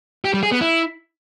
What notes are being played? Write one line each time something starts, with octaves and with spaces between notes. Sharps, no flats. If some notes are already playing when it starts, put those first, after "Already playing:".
G4
G3
G#4
B3
E4